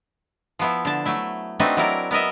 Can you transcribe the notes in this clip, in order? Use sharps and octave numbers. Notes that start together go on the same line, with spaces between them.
F3 B3 E4
D3 A5
F#3 A3 E4
A3 C4 D4 D#4 F#4 B4
F#3 E4 A#4 D5
B3 A#4 D#5 E5